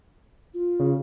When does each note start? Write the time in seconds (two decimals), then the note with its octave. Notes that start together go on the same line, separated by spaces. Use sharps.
0.54 F4
0.80 C#3